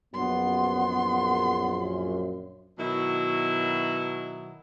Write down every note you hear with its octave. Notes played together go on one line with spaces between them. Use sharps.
A#1 F#2 B3 C6
B2 D#3 F#3 E4